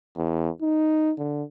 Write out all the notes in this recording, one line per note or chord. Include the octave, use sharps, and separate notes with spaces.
E2
D#4
D3